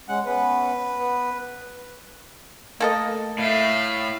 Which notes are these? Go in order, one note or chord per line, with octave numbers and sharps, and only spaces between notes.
G#3 C#4 F#5
B3 C#4 B4
B3
A3 A#3 A4 D#5
A2 E5 F5